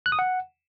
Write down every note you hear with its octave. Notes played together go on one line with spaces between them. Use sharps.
F#6
D#6
F#5